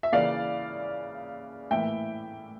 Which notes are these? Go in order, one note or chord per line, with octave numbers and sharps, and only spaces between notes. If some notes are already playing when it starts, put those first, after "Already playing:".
E5
C#3 E3 A#3 D5 F5
A2 E3 A#3 E5 G5